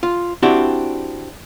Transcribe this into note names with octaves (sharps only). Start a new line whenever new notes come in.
F4
C4 D4 E4 F#4 G4